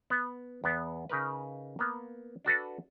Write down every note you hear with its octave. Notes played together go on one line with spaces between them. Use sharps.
B3
E2 B3
C#3 D#4 A#4 B4
A#3 B3
D4 F#4 A4 B4